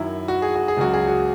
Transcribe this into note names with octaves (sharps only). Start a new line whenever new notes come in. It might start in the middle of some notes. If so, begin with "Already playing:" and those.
Already playing: F#2 D#3 F#3 E4
F#4
G#4
F#4
G#4
C#2 C#3 F#3 F#4
G#4
F#4